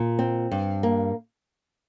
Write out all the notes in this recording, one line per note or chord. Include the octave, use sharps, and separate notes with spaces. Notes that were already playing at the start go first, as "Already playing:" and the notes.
Already playing: A#2
C4
G2
A#3